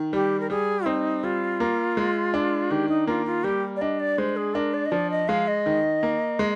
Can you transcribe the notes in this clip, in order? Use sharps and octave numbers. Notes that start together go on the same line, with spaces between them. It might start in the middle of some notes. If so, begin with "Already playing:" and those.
Already playing: D#3
G3 G4
A#4
G3 G#4
C4 D#4
G3 F4
A#3
G#3
D4
D#3 G4
D#4
A#3 F4
F4
G3 G4
D5
D4 D#5
D5
G#3 C5
G#4
D4 A#4
D5
D#5
F3 D5
D#5
G#3 F5
D#5
D#3
A#3
G#3